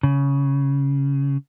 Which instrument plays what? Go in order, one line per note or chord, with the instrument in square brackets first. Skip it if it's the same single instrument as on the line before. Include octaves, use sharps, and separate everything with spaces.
[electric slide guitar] C#3